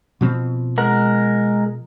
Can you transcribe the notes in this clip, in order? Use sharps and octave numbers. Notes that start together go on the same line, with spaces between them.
B2 F3 C4
G#3 A#4 F#5